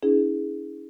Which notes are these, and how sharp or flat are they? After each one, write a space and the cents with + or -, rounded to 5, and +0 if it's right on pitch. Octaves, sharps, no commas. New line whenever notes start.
C#4 +30 E4 -35 G#4 +0